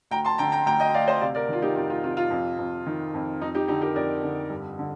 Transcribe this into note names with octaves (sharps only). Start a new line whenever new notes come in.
D2 G5 A#5
A5 C6
D3 G5 A#5
G5 A#5
D2 G5 A#5
D#5 G5
D2 D5 F5
C5 D#5
C3 D5 F5
A#4 D5
D#3 F4
D#4 G4
F2 F4
F4
C3 F4
F4
F2
F2
D#3
F2
F2 D#4
D#4 G4
D3 D#4 G4
G4 A#4
F2 A#4 D5
D3
G2
D3